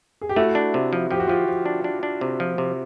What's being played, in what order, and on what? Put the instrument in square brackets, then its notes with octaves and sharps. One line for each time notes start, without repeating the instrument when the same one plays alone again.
[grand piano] G#4
G4
[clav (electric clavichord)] A3 [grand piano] E4 F#4
[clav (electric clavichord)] D4
C3
F3
[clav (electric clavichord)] F3 [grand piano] G4
[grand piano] F#4
[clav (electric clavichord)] F3 [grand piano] F4 G4
[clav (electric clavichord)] F3
D4
D4
D4
C3
F3
C3